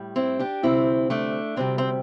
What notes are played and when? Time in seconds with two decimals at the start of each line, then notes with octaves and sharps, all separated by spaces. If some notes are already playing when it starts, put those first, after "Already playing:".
Already playing: A2 G3
0.16 C4 E4
0.39 D4 G4
0.63 D2 C3 G3 C4 E4
1.10 A3 D4
1.56 D2 C3 G3 C4
1.78 C4